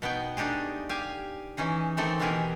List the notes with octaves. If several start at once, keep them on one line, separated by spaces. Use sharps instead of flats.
B2 B3 D#4 G5
A3 D4 D#4 G4 G#4
G4 F5 G#5
E3 C#4 D#4 G#4
D#3 E3 A3 C4 D#4 A4
B2 E3 B3 G4 G#4 A#4